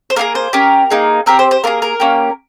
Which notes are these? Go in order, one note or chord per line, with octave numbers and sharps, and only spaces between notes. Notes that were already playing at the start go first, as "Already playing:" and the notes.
C5
A#3 F4 G#4 A#4
C5
C#4 G4 A#4
A#3 D#4 G#4
C4 G4 A#4
C5
C5
A#3 F4 G#4 A#4
A#4
A#3 C#4 G4